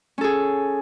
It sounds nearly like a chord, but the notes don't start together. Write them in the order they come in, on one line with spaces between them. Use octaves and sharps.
C#4 A4 G#4